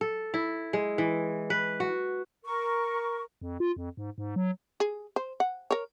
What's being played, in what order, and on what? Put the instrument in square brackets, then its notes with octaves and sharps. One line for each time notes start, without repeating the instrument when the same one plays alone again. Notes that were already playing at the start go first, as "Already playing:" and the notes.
[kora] A4
E4
G#3
E3
B4
F#4
[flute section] A#4 C#6
[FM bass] F2
F4
F2
G#2
G#2
F#3
[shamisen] G#4
C5
F#5
A#4 C#5